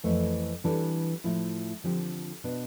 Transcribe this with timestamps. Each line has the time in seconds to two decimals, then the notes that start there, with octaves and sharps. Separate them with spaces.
0.04 F2 E3 A3
0.64 E3 G3 D4 A4
1.24 A2 F3 A3 E4
1.84 D3 F3 C4 G4
2.44 B2 B3 D4